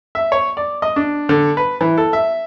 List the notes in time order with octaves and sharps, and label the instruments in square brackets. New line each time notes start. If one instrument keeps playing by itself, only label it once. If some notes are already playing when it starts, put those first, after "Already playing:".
[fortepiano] E5
C#5
D5
D#5
D4
D3
B4
E3
A4
E5